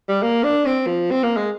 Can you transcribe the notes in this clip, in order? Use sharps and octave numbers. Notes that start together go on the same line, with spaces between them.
G3
A#3
D4
C4
F3
C4
A#3
G#3